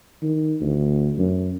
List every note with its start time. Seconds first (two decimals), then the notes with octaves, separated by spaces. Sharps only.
0.22 D#3
0.61 D2
1.18 F#2